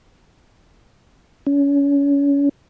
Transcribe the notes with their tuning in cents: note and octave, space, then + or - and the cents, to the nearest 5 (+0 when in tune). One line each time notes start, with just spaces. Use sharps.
C#4 +30